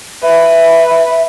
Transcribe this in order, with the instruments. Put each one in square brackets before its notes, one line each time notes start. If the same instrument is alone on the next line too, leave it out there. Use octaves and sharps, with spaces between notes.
[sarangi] B4 [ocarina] E5